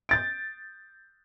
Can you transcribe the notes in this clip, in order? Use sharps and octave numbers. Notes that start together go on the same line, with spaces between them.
G6 A6 D7